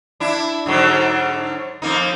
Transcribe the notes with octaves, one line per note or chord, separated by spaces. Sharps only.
D4 E4
G#2 D3 F#3
F2 A#3 D#4